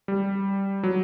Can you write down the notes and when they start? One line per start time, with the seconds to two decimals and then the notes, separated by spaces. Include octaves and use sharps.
0.08 G3
0.83 F#3